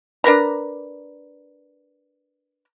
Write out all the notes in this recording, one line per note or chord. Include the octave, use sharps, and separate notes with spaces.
D4 A#4 B4 A#5